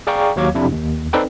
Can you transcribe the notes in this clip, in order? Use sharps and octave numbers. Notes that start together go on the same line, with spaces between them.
G#4 D5 F5 G5 A#5 C#6
D#2 F#3 C#5 F5 D6 G#6
F2 C3 D4 E4
D#2
C4 D#4 A4 B4 D5 G5